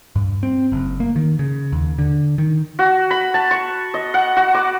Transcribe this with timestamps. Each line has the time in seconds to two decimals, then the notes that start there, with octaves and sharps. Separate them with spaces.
0.16 G2
0.43 C4
0.72 F#1
1.00 A#3
1.16 D#3
1.39 C#3
1.72 D#2
1.99 D3
2.38 D#3
2.79 F#4
3.11 B5
3.34 A5
3.51 C#6
3.94 D#5
4.14 F#5
4.37 F#4
4.54 D6